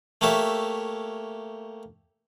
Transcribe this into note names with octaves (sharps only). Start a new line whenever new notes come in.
A3 A#3 G4 C#5 E5